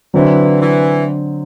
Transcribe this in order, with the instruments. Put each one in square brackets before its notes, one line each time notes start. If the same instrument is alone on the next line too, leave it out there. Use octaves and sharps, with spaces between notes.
[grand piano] D3 F#3 C4 [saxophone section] E3
[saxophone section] E3